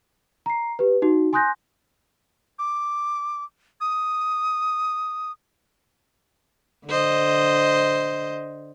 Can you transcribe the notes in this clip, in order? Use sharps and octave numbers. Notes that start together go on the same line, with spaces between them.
A#5 C7
G4 B4
D#4 F#4
G#5 C6 D#6 F#6 G6 A#6
D6
D#6
D3 C5 D#5